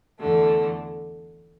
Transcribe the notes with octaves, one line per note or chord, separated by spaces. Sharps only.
E2 D3 A3